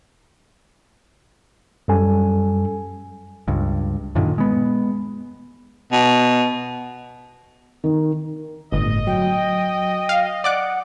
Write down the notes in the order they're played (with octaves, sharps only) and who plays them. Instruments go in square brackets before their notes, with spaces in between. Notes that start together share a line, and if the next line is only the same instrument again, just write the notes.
[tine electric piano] F#2 G3 A4 G#5
[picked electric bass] C#2 G2
F#2 A#2 D3 D#3
G#3 B3
[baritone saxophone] B2
[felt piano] D#3
[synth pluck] G1 [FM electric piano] A2 [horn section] D#5
[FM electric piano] F#3 [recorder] G5
[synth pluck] F5
[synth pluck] D5 D6 F#6 [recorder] F#5